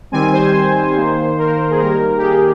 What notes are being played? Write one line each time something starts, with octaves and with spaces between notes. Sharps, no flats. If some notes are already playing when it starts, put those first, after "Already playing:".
D#3 G3 C4 G#5
C5
D#3 A#3
A#4
G#4
D#3 G3 A#3 A#4
G4
G#4
G#4